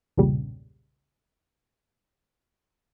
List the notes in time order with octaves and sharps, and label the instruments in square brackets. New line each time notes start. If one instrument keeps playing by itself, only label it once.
[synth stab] B1 E2 G2 A#2 C#3 G3